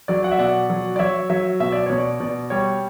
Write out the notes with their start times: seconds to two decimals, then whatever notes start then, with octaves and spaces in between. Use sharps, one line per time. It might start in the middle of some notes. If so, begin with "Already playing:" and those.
0.08 F#3 D5
0.23 D5 F#5
0.31 E5
0.38 B2 D5 F#5
0.70 F#3
0.96 D5
0.99 F#3 C#5 E5
1.30 F#3 C#5 E5
1.60 B2 E5
1.72 D5
1.86 B2 C#5
1.98 D5
2.20 B2 D5
2.50 G3 C#5